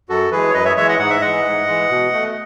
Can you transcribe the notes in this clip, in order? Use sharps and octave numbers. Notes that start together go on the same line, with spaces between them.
F#2 F#4 A4
E3 G#3 G#4 B4
C#5
F#2 B4 D#5
C#5 E5
E3 G#3 C#5 E5
D#5 F#5
G#2 F#5
E5
E3 G#3 D#5 F#5
G#2
E3 G#3
B2
A3